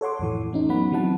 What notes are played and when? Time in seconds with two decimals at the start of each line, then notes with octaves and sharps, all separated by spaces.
0.01 A4 C#5 F#5 C6 D6
0.20 F2 A2 E3
0.53 A3 C#4 D#4
0.69 F#3 B3 C#4 F#5 B5
0.92 E3 F#3 C4 F#5 A5